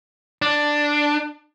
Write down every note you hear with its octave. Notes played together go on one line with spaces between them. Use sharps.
D4